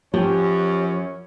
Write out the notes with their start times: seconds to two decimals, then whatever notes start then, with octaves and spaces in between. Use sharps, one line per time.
0.14 F#2 F3 C#4 G4 C#5